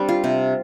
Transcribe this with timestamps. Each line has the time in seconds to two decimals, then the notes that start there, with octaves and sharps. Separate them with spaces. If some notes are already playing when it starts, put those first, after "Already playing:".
Already playing: G3 C4 D4
0.09 F4
0.24 C3